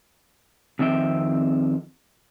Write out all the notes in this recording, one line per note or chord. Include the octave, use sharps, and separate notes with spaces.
F2 D#3 C4 E5 G5